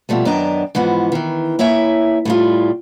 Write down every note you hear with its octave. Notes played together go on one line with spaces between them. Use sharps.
B2 F3 G3 A3
F#2 D#3 B3 D4 D#5 A#5
G#2 E3 F3 B3
D#3 E3
A#3 E4 C#5 E5 G#5
A2 G3 F4